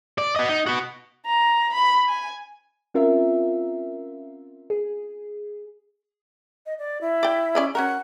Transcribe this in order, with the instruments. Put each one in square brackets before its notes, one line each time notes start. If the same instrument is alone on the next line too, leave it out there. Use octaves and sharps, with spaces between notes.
[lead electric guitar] D5
B3 D#5
D#4
B3 F#4
[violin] A#5
B5
G#5
[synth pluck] C4 C#4 F4 A#4 E5
G#4
[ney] D#5
D5
E4
[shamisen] D5 G5
C#4 D5 D#5
[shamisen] C#4 F#4 A#4 [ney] F#5